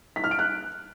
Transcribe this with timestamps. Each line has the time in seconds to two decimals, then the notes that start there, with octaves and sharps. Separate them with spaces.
0.16 B6
0.24 F6
0.31 D7
0.39 F#6